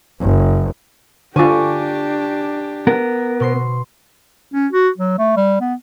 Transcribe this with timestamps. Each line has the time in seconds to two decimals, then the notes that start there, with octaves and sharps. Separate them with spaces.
0.21 F#1
1.36 D3 D4 F4 G4 G#5 C#6 D6
2.87 B3 A#4
3.40 B2 C6 C7
4.53 C#4
4.73 F#4
4.98 F#3
5.18 A3
5.36 G3
5.61 B3